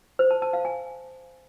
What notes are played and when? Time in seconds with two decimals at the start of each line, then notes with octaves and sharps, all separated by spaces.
0.19 C5
0.31 A5
0.42 A5
0.53 F5
0.65 G#5